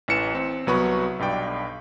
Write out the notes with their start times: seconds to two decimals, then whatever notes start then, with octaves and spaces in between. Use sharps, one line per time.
0.08 A1 E3 C#7 E7
0.35 C4
0.67 C2 F#3 B3 B5 C#6
1.19 B1 G2 D5 G5